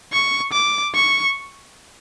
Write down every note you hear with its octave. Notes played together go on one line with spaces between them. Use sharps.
C#6
D6
C#6